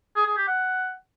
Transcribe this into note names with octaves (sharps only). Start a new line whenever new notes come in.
G#4
G#4
G4
F#5